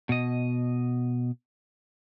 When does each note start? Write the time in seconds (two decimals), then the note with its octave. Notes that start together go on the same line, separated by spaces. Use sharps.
0.09 B2 D#5